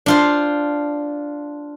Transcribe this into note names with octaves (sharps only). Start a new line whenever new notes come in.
D4 F4 C5